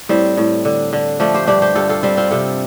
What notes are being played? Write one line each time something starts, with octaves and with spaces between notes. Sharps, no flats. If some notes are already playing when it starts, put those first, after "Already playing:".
A2 G3 C4
A2
D3
D3
F3 A3 D4
G4 C5
G2 D4 G4
G4 C5
G2 F4 A4
F4 A4
G3 C4 F4
C4 F4
C3 F4 A4